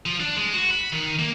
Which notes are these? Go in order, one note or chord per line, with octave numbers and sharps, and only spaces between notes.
F3
D4
G#3
F#4
B5
D#3
A#3